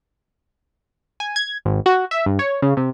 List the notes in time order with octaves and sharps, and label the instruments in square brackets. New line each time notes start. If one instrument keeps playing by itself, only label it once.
[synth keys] G#5
G#6
G#1
F#4
E5
G2
C#5
C#3
C3